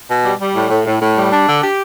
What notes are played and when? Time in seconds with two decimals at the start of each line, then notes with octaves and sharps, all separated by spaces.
0.08 B2
0.24 G3
0.39 G3
0.54 A2
0.70 A2
0.85 A2
1.00 A2
1.16 G3
1.31 D4
1.47 D3
1.62 G4